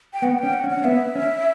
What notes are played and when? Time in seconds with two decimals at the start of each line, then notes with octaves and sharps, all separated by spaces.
0.14 G5
0.22 B3 F#5
0.39 C#4 G5
0.53 F#5
0.64 C#4
0.70 F#5
0.77 C#4
0.84 B3 E5
1.15 C#4